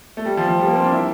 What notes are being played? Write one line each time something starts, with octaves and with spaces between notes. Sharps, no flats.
A3
G3
F3
F3
G3
A#3
C4
D4
E4